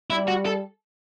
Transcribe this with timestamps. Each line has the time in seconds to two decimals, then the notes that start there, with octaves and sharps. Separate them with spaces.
0.10 G3 E4
0.28 F#4
0.46 A4